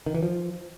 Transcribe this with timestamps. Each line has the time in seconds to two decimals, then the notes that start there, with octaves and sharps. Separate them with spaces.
0.06 D#3
0.15 E3
0.23 F3